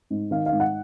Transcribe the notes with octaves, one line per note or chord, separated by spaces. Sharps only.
G#2
D#3 F5
F5
G#2
F#5